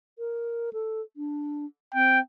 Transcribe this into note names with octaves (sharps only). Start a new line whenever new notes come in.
A#4
A4
D4
C4 G5